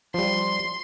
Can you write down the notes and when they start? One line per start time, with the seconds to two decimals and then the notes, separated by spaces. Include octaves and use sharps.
0.14 F3 G3 C6